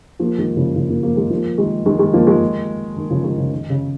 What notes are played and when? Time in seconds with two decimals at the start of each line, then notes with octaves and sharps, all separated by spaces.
0.19 F3 A#3
0.38 D#3 G#3
0.57 C#3 F3
0.75 C#3 F3
0.89 F3 A#3
1.03 F3 A#3
1.17 D#3 G#3
1.30 F3 A#3
1.58 D#3 G#3
1.86 D#3 G#3
1.99 D#3 G#3
2.13 F3 A#3
2.27 D#3 G#3
2.97 D#3
3.10 C#3 F3
3.24 D#3 G#3
3.38 C#3 F3
3.52 D#3
3.70 C#3